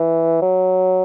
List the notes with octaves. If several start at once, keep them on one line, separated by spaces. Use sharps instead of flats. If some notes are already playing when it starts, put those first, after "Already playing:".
Already playing: E3
F#3